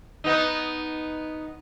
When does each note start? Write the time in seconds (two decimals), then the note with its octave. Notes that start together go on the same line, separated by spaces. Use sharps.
0.24 B3 D#4